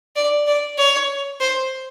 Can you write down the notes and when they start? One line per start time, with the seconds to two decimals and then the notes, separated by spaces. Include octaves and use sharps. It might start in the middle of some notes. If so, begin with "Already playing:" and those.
0.16 D5
0.47 D5
0.78 C#5
1.41 C5